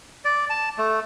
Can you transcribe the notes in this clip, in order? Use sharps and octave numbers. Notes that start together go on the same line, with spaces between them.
D5
A5
A3